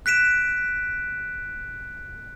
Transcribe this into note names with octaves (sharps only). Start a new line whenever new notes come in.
F#6 B6 D7 E7